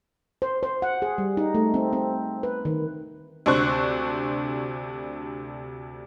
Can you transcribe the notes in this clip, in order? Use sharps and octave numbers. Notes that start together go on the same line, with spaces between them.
C5
C5
F#5
G#4
G3
D#4
A3
C4
C4
B4
D#3
D2 C3 D4 C5 C#6 F#6